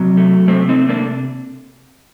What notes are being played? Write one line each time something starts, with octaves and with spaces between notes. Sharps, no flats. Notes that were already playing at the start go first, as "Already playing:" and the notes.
Already playing: C3 F#3
A3
C3 A3 C4
C4 D#4
A3
A#3 D4